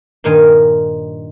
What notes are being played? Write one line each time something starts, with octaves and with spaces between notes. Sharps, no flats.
G2 A#2 D#3 D#4 F5 G#5